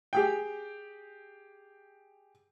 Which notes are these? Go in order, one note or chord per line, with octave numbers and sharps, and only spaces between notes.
G4 G#4 G5